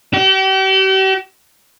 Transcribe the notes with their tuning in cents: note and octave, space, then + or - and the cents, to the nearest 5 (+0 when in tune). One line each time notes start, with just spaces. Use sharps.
G4 -40